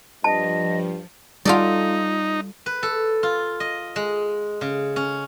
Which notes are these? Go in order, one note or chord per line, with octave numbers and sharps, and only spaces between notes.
G2 F3 D#5 A5
G3 D#4 F4 A4 D5
B4
A4
F4
D#5
G#3
C#3
C#4